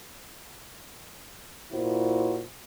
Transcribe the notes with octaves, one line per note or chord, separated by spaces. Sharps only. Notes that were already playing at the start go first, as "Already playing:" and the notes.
A#2 E4 F#4 C5